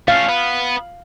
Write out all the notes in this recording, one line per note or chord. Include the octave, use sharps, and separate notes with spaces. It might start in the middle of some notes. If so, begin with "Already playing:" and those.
A3 C#4 F5
B3